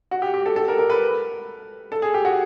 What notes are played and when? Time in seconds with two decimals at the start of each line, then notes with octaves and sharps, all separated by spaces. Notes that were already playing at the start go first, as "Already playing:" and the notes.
0.11 F#4
0.22 G4
0.34 G4
0.46 A4
0.56 A4
0.68 A#4
0.78 A#4
0.90 B4
1.92 A4
2.02 G#4
2.14 G4
2.25 F#4